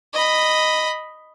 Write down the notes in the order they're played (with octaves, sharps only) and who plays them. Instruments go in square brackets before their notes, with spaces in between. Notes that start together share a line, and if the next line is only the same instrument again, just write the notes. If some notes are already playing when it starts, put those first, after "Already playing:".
[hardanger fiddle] D#5 B5